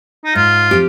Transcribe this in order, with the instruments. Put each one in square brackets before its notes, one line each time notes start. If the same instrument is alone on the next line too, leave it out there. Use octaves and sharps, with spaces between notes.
[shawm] D#4
[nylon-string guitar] G#2 [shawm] F4
[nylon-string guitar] F3 C4 G4